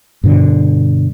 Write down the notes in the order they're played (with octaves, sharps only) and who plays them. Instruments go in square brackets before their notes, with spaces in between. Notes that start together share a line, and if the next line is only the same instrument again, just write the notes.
[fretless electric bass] G2 B2 D3